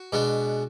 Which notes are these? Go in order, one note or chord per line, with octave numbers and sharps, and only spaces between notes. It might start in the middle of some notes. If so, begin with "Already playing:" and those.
Already playing: F#4
B2 G#3 D4